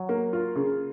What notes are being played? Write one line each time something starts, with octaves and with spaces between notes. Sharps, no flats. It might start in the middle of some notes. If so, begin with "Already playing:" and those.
Already playing: F#3
A#3
F4
C#3